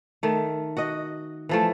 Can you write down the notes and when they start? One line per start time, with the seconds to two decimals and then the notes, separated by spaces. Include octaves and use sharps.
0.23 D#3 A3
0.77 F#4 D#5
1.49 E3 F3 A3